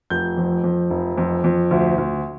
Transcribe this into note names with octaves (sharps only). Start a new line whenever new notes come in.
F1 G6
F2
F2
F1
F2
F2
D2
D2